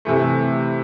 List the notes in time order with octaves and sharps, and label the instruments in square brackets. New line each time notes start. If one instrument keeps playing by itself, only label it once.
[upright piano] C3 E3 A3